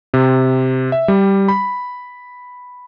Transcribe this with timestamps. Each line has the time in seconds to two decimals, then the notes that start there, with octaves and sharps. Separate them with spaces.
0.14 C3
0.92 E5
1.08 G3
1.48 B5